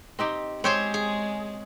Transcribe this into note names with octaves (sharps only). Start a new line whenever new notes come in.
C4 D#4 G4
G#3 C4 G4 G#4 C5 C#5
G#4